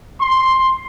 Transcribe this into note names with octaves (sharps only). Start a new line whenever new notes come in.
C6